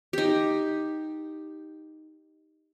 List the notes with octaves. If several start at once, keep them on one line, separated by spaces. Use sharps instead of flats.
D#4 G4